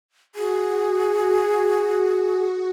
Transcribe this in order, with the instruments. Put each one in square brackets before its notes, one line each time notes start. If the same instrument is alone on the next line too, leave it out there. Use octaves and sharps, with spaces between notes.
[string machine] F#4 [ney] G#4